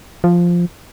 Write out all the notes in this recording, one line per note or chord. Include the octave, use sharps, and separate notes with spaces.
F3